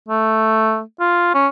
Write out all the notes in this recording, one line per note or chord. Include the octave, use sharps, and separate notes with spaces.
A3
F4
C#4